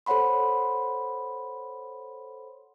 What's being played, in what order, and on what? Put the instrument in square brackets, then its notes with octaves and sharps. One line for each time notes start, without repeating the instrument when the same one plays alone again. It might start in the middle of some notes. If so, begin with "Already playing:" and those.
[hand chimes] A4 C5 C#5 F#5 B5 C6